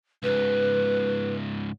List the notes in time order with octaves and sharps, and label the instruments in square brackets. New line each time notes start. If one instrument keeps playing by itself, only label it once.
[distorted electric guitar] C#2 G#2 [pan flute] B4